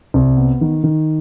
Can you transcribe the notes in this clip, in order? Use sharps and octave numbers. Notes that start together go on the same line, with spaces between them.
C2
B3
D#3
D#3